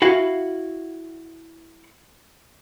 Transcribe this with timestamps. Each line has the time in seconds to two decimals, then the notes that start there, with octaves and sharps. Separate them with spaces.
0.02 E4 F#4 F5